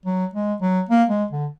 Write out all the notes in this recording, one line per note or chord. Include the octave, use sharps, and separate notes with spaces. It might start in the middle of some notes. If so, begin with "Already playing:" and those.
F#3
G#3
F#3
A#3
G#3
D3